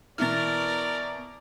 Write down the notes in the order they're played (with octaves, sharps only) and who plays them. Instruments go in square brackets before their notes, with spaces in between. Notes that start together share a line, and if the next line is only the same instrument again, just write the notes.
[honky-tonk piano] B2 E3 [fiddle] A#4 [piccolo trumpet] D5 [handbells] F6 A6